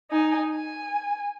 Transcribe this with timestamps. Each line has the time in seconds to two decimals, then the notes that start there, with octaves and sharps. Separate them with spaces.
0.11 D#4 G#5
0.50 G#5